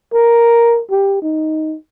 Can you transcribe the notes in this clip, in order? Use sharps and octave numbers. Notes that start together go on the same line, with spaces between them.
A#4
G4
D#4